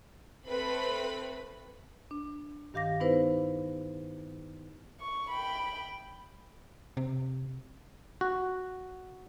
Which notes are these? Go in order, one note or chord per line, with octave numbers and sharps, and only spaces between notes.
A3 C4 B4 B5
D4
G2 D#3 G4 F5 D6 A#6
B3 D#4 E4 B4 C5
C#6
G5 B5
C3
F#4